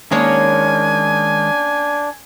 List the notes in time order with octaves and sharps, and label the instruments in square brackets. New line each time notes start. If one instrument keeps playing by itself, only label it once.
[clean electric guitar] D#3 G#3 [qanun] A#3 C#4 C#5 [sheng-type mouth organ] D4 [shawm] G#5